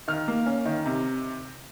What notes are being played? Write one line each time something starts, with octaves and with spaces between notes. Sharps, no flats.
D#3 F6
A#3
C#4
D#3
C3